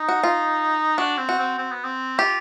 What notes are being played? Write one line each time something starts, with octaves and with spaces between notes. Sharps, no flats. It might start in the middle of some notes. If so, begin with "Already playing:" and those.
Already playing: D#4
F#4
F4
D4 F#4
C4
F#4
C4
C4
B3
C4
F4 G4